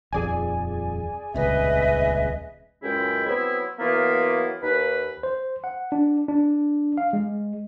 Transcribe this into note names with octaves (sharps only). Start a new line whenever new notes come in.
D#1 F2 G#4 D5 G#5
D#1 C#2 C3 B4 D#5 E5
C#2 F#2 C#3 G#3 E4 G5
F#3 B3 C4 E4
E3 F#3 A#3 B3 E4 F4
D#2 B4
C5
F#5
D4
D4
F5
G#3